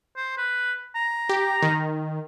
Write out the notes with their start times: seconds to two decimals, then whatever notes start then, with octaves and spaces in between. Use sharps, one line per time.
0.16 C5
0.37 B4
0.95 A#5
1.29 G4
1.62 D#3